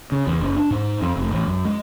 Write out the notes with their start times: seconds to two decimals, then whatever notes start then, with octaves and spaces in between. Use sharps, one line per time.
0.12 C#3
0.27 E2
0.40 F#1
0.57 D4
0.71 G#2
1.02 F2
1.16 F1
1.31 A1
1.46 F#2
1.65 G#3